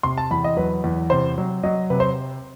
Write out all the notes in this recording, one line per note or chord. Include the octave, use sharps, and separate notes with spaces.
C3 C6
A5
E2 B5
D#5
F#3 B4
E2
C3 C5
F#3
F#3 D#5
C3 B4
C5